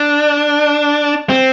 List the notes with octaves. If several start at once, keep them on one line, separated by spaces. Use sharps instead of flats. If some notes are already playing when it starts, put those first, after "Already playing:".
Already playing: D4
C4